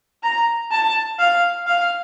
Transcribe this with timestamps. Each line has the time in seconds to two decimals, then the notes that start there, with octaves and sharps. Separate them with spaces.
0.23 A#5
0.71 A5
1.19 F5
1.67 F5